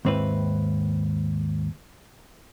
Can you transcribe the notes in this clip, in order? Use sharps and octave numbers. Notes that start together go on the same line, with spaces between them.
D#2 G#2 C4 E4 B4